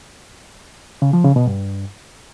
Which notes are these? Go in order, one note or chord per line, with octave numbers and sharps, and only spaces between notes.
C#3
F3
C#3
B2
G2